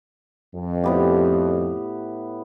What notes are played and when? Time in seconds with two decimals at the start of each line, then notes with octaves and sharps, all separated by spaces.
0.55 F2
0.84 A2 B3 G4